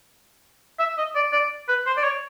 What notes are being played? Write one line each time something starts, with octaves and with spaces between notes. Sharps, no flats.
E5
D#5
D5
D5
B4
C5
D5
C#5